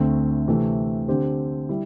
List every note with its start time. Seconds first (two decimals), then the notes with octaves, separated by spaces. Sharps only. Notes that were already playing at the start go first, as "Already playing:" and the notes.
Already playing: D2 D3 A3 C4
0.48 C3 E3 A3 C4
1.08 D3 C4 G4 C5
1.69 G3 E4